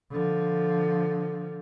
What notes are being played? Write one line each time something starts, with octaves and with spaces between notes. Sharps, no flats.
D3 F3